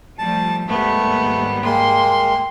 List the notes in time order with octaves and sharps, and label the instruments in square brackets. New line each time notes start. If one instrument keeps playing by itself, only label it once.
[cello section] F3 G3 A3 [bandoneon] A5
[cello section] D#2 G#2 G3 [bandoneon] A3 [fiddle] B3
[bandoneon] G#3 A#3 [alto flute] G5 [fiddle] C6